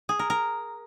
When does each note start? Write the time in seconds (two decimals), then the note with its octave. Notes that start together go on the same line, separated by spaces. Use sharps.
0.09 G#4
0.19 A#4
0.30 A#4